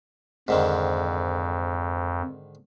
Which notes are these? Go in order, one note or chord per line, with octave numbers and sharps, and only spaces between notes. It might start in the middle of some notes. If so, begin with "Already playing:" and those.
F2 G#2 D3 D#3